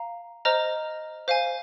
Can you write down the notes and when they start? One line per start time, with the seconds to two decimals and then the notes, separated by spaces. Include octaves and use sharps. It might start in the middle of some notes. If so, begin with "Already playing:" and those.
Already playing: F5 A#5
0.45 C5 D#5 A#5 F6
1.28 C5 F5 G#5